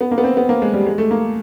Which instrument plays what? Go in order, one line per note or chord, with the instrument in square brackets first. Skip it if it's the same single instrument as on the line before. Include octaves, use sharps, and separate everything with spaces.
[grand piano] B3
A#3
B3
C4
B3
A#3
G#3
G3
G#3
A3
A#3